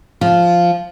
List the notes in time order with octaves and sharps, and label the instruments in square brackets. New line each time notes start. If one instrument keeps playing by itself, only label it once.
[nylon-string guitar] F3